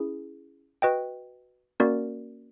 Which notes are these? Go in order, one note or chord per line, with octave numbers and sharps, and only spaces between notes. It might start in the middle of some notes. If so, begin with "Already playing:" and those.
Already playing: C#4 E4 G#4
F#4 B4 D#5 G5
A#3 C#4 F#4 A#4 D5